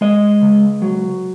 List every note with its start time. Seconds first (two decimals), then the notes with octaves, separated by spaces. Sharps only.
0.01 G#3 D#5
0.42 C#2
0.82 F#3